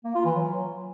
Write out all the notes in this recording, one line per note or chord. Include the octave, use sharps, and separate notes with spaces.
A#3
F4
E3
F#3